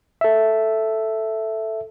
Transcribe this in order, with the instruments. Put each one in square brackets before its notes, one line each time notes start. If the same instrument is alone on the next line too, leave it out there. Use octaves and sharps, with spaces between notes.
[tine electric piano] A4 E5